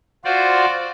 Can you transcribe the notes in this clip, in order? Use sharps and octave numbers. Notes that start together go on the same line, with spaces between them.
F4 F#4 C5 D5